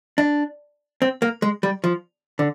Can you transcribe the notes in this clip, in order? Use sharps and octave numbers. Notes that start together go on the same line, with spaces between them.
D4
C4
A#3
G#3
G3
F3
D3